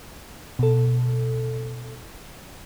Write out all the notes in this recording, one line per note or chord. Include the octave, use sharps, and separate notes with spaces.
B2 A4